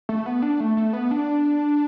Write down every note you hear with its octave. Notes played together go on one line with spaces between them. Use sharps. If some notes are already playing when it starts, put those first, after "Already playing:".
A3
B3
D4
A3
A3
B3
D4